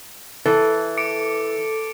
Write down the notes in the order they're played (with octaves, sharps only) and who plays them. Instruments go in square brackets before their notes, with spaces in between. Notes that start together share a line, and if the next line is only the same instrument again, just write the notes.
[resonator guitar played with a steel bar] E3 [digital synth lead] A4
[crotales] D6 C#7 D7